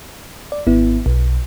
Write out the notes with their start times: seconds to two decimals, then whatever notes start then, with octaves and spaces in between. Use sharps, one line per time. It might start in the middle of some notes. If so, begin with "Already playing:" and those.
0.52 D5
0.67 G#1 B3 E4
1.06 B1